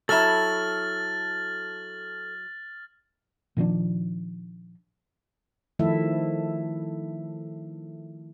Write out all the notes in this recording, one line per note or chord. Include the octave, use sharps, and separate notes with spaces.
F#3 E4 A4 A5 F6 A6 F#7
A#2 D#3 F3 D4
D#3 F3 A3 E4 A4 E5